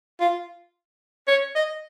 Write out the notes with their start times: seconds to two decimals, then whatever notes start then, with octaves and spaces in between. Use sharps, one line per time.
0.20 F4
1.28 C#5
1.55 D#5